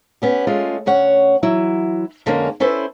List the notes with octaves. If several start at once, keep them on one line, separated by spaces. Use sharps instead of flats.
B3 C#4 G4
G#3 A3 C#4 F4
D2 C#4 C#5 F#5
E3 F#3 E4
F2 D3 G#3 A#3 C#4
C#4 E4 A4 B4 C5